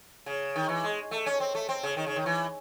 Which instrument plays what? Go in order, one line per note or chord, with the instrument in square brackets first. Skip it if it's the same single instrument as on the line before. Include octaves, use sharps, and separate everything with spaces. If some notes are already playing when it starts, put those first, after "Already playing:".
[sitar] C#3
D#3
E3
G#3
A3
C#4
C4
A3
C4
C#3
D#3
C#3
D#3
E3